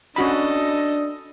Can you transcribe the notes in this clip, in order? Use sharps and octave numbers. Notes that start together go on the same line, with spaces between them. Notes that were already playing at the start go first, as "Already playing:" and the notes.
C#4 D4 F#4 A4 D#5 B5